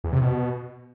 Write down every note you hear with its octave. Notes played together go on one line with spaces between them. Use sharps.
E2
C3
B2